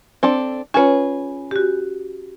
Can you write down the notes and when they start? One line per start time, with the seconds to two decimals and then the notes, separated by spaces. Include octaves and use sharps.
0.23 C4 D4 A4
0.74 C#4 F4 G#4 B4 C#5
1.51 F#4 G4